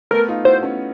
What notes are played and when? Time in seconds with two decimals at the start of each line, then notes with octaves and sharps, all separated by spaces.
0.11 A3 B3 A#4
0.28 D#4 F4
0.45 E4 F#4 C5
0.63 B3 C#4